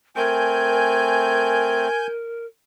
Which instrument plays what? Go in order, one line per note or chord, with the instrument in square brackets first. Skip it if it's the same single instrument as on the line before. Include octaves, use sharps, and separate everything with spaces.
[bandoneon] A3 C4 [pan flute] A#4 [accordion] G#5 G6